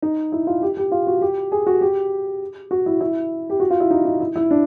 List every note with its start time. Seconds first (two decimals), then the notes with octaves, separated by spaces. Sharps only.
0.02 D#4
0.32 E4
0.47 F4
0.62 G4
0.77 G4
0.92 F4
1.07 F#4
1.21 G4
1.52 G#4
1.67 F#4
1.81 G4
2.71 F#4
2.86 E4
3.01 E4
3.50 G4
3.60 F#4
3.70 F4
3.80 E4
3.90 D#4
4.05 D#4
4.20 E4
4.36 E4
4.51 D4